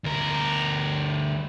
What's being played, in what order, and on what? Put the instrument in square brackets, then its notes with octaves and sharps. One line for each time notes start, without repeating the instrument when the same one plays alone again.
[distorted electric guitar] D2 A#4